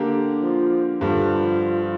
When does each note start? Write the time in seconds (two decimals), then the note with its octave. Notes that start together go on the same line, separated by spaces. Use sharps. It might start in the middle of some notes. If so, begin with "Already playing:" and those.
Already playing: D3 A#3 G4
0.42 F3
1.01 G2 D3 F3 G3